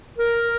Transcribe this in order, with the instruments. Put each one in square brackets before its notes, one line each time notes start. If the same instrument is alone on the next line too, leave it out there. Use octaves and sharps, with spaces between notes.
[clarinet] A#4